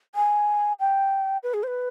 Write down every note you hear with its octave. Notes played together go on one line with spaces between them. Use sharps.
G#5
G5
B4
G#4
C5
B4